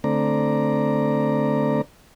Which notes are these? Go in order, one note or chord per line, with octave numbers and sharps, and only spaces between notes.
D3 A3 C4 D5 A#5